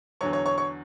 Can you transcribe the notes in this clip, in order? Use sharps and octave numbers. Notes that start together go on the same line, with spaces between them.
E2 D3 F#3 C#5 C#6
C#5 C#6
C#5 C#6
C#5 C#6